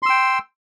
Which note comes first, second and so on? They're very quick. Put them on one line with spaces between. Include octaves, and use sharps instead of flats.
C6 E6 G5